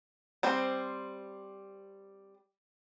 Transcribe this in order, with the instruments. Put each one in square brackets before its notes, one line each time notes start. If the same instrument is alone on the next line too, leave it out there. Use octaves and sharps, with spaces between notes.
[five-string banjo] G3 C4 C5